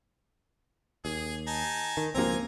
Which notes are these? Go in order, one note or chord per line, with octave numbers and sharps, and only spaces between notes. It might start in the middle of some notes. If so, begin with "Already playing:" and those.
D#2 G#4
D#4 G#5 A5
D#3
C#2 F3 A#3 C4 G#5 A#5